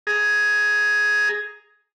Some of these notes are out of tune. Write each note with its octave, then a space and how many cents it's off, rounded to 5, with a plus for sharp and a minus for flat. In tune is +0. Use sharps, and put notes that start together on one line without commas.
G#4 +10 A#5 +0